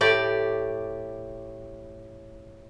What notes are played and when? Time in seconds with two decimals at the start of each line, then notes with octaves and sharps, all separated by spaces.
0.01 A2 G4 D5